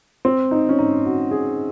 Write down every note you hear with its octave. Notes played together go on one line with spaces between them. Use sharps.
C4
D#4
C#4
D#4
F#4
G#4